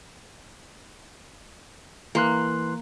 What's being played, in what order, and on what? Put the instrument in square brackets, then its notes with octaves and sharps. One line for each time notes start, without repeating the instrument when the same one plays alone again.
[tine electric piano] E3 C6 F#6 [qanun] A#3